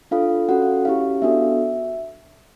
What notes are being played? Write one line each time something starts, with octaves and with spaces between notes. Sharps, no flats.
D4 F4 A4 F5
C#4 F#4 A4 F#5
C#4 E4 G4 F5
B3 D4 F#4 A4 E5